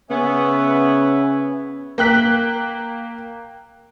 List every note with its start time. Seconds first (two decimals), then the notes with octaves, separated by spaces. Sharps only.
0.10 C#3 B3 C#4 C#5 E5
1.98 A#3 G5 F#6 B6